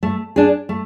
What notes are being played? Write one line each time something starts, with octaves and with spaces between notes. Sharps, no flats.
A3
D4 G#4
A3